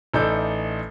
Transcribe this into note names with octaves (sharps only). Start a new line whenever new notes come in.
A1 D#4 A4 D5 E5 G6